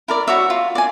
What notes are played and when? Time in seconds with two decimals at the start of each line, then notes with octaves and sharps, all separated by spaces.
0.08 E4 A#4 D5
0.27 F#4 C#5 E5
0.50 F4
0.75 D5 G#5